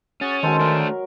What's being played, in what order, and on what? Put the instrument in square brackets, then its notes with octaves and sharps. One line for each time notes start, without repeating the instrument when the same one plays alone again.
[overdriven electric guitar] C#4 [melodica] F#4 G#4 F#5 [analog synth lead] A6
[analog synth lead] D#3 [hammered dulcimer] F#3 G#3 [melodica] A4 C5 A5
[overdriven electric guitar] A3 D4 [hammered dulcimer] A#4